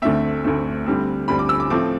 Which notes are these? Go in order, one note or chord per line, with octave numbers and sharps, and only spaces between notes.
D2 D3 A3 C4 E5
D2 D3 A3 C4
D2 D3 G3 C4
D2 D3 G3 C4 B5
D6
E6
D6
A2 F3 A3 C4 D6